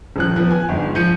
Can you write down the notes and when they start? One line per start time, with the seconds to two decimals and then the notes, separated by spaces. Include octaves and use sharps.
0.16 D#1 F3 F#6
0.36 F3 B3
0.51 G#5
0.69 G1 G#2
0.95 F3 G6 C#7 D#7